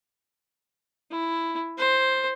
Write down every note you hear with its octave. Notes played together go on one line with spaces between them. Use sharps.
E4
C5